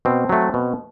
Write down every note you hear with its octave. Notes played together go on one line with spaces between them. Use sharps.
B2 C4
F#3 A3
B2